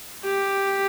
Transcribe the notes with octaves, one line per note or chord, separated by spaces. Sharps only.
G4